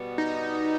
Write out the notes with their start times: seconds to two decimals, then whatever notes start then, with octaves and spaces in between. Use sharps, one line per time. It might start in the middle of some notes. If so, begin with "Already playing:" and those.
Already playing: B2 G3 B3
0.18 D#4